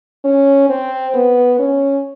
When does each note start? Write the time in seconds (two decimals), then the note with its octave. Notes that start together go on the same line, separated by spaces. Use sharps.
0.25 C#4
0.69 C4
1.14 B3
1.59 C#4